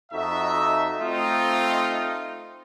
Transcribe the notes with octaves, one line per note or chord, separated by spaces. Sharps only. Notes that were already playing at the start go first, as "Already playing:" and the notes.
F2 D#4 F#4 A4 E5
A3 C4 D#4 F4